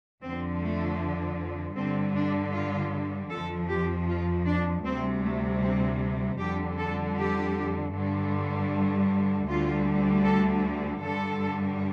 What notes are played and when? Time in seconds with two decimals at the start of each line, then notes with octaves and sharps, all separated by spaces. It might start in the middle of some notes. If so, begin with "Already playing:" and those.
0.22 F2 D3 F3 C4
0.60 A3
1.76 G2 D3 G3 C4
2.15 D4
2.53 F4
3.30 F2 F3 A4
3.69 G4
4.07 F4
4.46 D4
4.84 D2 C3 G3 C4
5.23 A3
5.61 C4
6.38 F2 D3 G3 G4
6.77 A4
7.16 G4
7.93 G2 D3 G3
9.47 D2 D3 G3 F4
10.24 A4
11.01 G2 D3 G3 A4